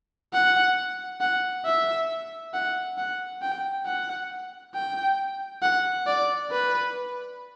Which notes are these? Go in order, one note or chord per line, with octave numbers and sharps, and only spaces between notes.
F#5
F#5
E5
F#5
F#5
G5
F#5
G5
F#5
D5
B4